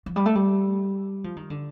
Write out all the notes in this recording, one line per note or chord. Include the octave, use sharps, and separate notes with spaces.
F3
G3
A3
G3
F3
D#3
D3